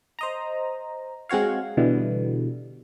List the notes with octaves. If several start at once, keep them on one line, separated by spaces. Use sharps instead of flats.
C5 D#5 A#5
G#3 C4 F#4 C#5 F5
B2 D3 E3 G3